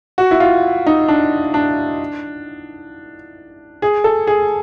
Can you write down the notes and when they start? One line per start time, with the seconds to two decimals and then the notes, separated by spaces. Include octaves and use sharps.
0.18 F#4
0.31 E4
0.40 F4
0.86 D#4
1.08 D4
1.54 D4
3.82 G#4
4.04 A4
4.27 G#4